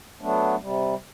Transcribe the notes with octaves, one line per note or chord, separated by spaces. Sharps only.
F#3 A3 B3 D4
C3 G3